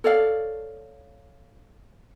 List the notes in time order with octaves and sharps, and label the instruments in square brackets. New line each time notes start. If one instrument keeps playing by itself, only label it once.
[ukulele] A4 C#5 D5 F5